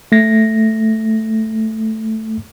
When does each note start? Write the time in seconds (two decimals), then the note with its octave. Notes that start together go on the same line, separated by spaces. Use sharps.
0.12 A3 A#6